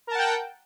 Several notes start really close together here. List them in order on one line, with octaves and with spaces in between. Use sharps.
A#4 A5 F#5 G5